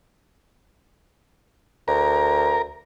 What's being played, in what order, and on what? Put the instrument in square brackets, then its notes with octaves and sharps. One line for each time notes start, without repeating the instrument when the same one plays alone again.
[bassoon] D2 [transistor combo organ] A#4